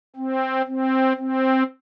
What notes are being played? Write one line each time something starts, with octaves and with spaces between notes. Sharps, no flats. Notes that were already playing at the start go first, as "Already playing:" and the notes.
C4
C4
C4